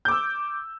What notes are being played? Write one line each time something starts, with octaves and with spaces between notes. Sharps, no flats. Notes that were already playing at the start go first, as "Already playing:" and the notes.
D6 E6 G6